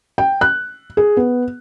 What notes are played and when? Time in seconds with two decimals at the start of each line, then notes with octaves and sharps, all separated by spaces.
0.18 G5
0.41 F#6
0.97 G#4
1.17 B3